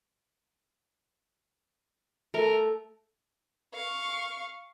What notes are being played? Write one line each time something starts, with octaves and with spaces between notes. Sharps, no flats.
A3 A#4
F5 C#6